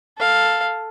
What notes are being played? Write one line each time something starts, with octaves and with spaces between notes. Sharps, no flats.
A4 F5